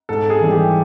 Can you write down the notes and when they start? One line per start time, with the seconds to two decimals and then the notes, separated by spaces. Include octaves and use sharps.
0.09 G#2 A4
0.30 G#4
0.40 E3 G3
0.51 G4